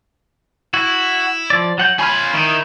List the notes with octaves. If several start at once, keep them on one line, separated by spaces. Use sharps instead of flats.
E4 F#4
F3 D5
F#3 F#5 G6
F4 C#5 G#5 B5 F6
D#3 D#4 E4